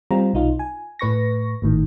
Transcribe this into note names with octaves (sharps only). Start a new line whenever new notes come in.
G3 C4 F4 A#5
B1 D#4 F4
G#5
A2 B4 C#6 A#6
G#1 A2 D#3